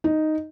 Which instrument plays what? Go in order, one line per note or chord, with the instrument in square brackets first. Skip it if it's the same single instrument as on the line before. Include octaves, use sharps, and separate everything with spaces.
[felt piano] D#4